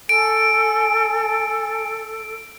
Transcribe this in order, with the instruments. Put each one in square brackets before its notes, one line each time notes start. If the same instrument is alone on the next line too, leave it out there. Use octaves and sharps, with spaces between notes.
[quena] A4 [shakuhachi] G#5 [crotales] D7